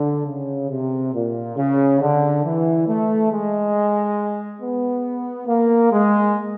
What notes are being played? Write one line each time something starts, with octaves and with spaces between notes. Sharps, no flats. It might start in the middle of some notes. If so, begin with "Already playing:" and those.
Already playing: D3
C#3
C3
A#2
C#3
D3
E3
A3
G#3
B3
A#3
G#3